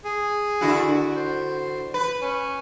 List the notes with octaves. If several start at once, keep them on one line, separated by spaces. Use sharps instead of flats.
G#4
D3 E4 F#4
C5
B4
C#4